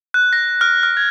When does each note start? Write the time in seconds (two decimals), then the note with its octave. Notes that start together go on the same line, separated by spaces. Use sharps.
0.14 F#6
0.33 A#6
0.61 F6
0.83 F6
0.97 G#6